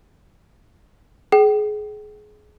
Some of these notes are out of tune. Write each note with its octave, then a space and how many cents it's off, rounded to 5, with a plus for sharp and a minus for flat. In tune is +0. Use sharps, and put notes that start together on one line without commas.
G#4 +25 G5 -30